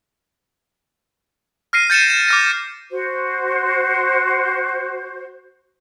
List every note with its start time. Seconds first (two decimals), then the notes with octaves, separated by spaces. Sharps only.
1.73 F6 A#6 C7 D#7
1.90 G6 A6 C#7 D#7 E7
2.10 E7
2.28 D6 F6 A#6
2.91 F#4 C5